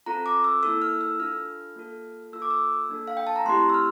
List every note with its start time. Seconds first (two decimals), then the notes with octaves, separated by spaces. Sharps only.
0.06 C4 F4 A4 A#5
0.26 D6
0.44 E6
0.63 A#3 E4 A4 E6
0.82 F6
1.01 E6
1.19 D4 F4 A4 F6
1.76 A#3 F4 A4
2.32 A#3 F4 A4 E6
2.42 D6
2.50 E6
2.89 A#3 D4 A4
3.08 F5
3.17 G5
3.27 A5
3.36 A#5
3.45 A3 C4 E4 G4 C6
3.70 E6
3.74 F6